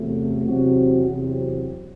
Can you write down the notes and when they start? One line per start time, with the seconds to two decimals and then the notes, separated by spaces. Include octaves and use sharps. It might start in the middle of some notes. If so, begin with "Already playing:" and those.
Already playing: E2 C3 F#3 A3
0.45 E2 C3 F#3 C4 F#4
1.06 E2 C3 F#3 C4